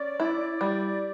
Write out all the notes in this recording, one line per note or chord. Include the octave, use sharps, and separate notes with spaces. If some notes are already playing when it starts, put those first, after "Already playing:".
Already playing: C#4 D5
E4
G3